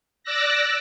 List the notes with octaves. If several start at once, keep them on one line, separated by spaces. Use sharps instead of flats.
D5 D6 E6 F#6 A#6